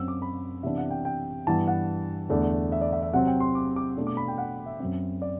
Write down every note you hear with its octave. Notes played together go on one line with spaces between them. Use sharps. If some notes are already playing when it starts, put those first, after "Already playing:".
Already playing: F#2 F#3 C4 E6
D6
B5
C3 E3 B3 D4 E5
F#5
G5
G5
G2 E3 B3 A5
F#5
E2 D3 A3 D4
E5
D5
E5
E5
C3 F#3 C4 F#5
G5
C6
D6
D6
B2 A3 D4
D6
B5
G5
F#5
E5
F#2 F#3 C4 E5
D5